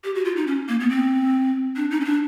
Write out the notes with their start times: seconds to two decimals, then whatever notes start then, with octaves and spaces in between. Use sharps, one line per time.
0.04 G4
0.15 F#4
0.25 F4
0.36 D#4
0.47 C#4
0.68 A#3
0.80 B3
0.90 C4
1.76 D4
1.91 D#4
2.01 C#4
2.05 D4